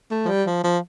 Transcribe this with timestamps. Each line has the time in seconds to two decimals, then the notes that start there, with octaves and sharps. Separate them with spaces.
0.11 A3
0.25 F3
0.28 G3
0.46 F3
0.64 F3